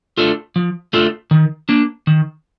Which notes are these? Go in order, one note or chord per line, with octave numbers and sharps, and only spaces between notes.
A3 D4 F4 A4
F3
A3 D4 F4 A4
D#3
A#3 D4
D#3